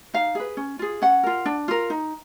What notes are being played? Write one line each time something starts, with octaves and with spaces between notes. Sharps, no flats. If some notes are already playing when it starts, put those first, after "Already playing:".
D#4 F5
G#4 B4
C#4
F4 G#4
C#4 F#5
F4 A#4
D4
F4 A#4
D#4